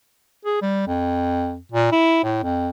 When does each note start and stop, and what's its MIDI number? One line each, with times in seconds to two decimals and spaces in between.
0.45 0.62 68
0.62 0.86 55
0.87 1.58 41
1.72 1.90 46
1.92 2.21 64
2.24 2.40 45
2.43 2.70 41